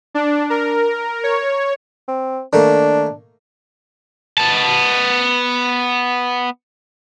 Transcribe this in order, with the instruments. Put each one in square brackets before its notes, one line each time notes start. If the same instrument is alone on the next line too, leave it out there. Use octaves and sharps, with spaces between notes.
[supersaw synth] D4
A#4
C#5
[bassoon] C4
[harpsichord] D#3 A3 A#3 [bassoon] D4
[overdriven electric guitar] B3 A5